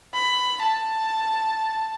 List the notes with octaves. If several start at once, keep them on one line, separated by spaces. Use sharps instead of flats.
B5
A5